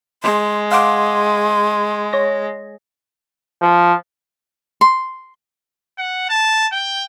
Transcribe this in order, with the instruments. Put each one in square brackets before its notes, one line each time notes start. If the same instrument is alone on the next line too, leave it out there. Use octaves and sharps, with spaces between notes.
[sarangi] G#3 [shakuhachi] C6
[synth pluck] F5 F#5 D6 [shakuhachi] C6
[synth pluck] C#5 A#6
[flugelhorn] F3
[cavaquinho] C6
[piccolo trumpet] F#5
A5
G5